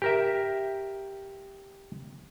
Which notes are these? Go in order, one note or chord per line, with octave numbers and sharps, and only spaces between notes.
G4 A#4 E5